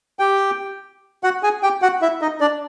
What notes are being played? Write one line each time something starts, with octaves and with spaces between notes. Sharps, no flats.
G4 G5
F#4 F#5
G#4 G#5
G4 G5
F#4 F#5
E4 E5
D#4 D#5
D4 D5